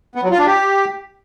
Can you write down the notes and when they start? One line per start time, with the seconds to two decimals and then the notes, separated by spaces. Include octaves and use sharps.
0.16 B3
0.23 F#3
0.31 F4
0.39 D4
0.46 G4